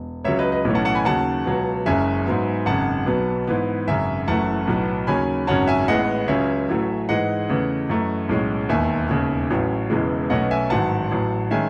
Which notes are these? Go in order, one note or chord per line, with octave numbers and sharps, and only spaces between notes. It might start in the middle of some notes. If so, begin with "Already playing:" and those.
Already playing: E1
C#2 C#3 F#3 C#5 E5
B4 D#5
B4 D#5
B1 A2 E3 A3 C#4
F#5 A5
F#5 A5
G#5 B5
D#2 C#3 F#3 F#5 A5
C#2 B2 F#3
F#1 F#2 C#3 G#3 C#4 E5 G#5
G#2 F#3 B3
G#1 F#2 C#3 F#5 A5
B1 B2 F#3 B3
G#2 E3 B3
G#1 F#2 C#3 E5 G#5
F#1 F#2 E3 A3 F#5 A5
B1 A2 F#3 B3
D#2 C#3 F#3 C#4 G#5 B5
G#1 F#2 C#3 F#3 C#4 F#5 A5
E5 G#5
A1 A2 G#3 B3 D#5 F#5
C#2 C#3 F#3 C#4 E5 G#5
A1 A2 F#3 A3
G#2 E3 G#3 D#5 F#5
E2 C#3 E3 A3
F#2 E3 A3
B1 A2 G#3 C#4
E1 D#2 D#3 E5 G#5
E1 D#2 C#3
A1 A2 F#3 C#4
E1 E2 C#3 E3 G#3
B1 B2 A3 C#4 D#5 F#5
E5 G#5
A1 G#2 D#3 F#3 F#5 A5
A1 A2 F#3
D#3 G#3 C#4 E5 G#5